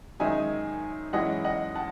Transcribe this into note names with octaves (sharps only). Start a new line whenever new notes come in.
F#2 D#3 G#3 D#4 E5 G#5
F#2 E3 G#3 C#4 E4 D#5 F#5
D#5 F#5
F#5 A5